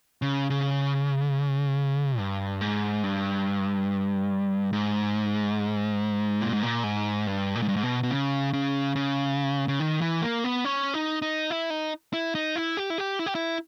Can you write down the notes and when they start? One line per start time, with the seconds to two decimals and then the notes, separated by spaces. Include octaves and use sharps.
0.22 C#3
0.50 C#3
2.18 G2
2.61 G#2
3.03 G2
4.73 G#2
6.41 A#2
6.53 G#2
6.63 A#2
6.84 G#2
7.27 G2
7.55 A#2
7.62 G#2
7.69 G2
7.76 G#2
7.83 B2
8.03 B2
8.11 C#3
8.53 C#3
8.96 C#3
9.68 C#3
9.80 D#3
10.01 E3
10.22 A#3
10.44 B3
10.64 C#4
10.94 D#4
11.22 D#4
11.50 E4
11.70 D#4
12.13 E4
12.35 D#4
12.56 E4
12.77 G4
12.90 E4
12.98 G4
13.19 E4
13.26 G4
13.35 E4